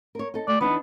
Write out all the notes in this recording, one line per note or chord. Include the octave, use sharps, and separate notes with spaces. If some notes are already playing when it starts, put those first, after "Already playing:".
A#4 C#5
D#4 A4
A3 D5
E3 B3 D4 D#4